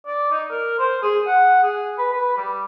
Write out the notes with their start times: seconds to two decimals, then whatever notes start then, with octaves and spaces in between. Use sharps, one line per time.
0.07 D5
0.31 D#4
0.50 A#4
0.79 C5
1.02 G#4
1.27 F#5
1.63 G#4
1.98 B4
2.13 B4
2.37 G3